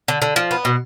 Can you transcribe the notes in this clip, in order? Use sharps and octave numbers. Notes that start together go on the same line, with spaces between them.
D3
D3
F3
B3
B2